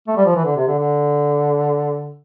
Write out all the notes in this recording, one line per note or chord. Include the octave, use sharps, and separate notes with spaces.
A3
G3
F3
E3
D3
C3
D3
D3